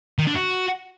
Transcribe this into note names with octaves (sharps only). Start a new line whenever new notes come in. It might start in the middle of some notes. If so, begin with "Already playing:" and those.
D#3
D4
F#4